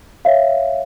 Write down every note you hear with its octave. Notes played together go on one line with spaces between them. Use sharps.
C#5 E5 F5